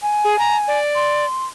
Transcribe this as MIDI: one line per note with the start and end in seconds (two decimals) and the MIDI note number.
0.02 0.79 80
0.24 0.38 68
0.39 0.56 82
0.68 1.25 74
0.95 1.46 84